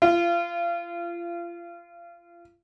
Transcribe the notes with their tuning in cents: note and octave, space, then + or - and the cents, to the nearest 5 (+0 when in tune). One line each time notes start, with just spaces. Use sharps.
F4 -30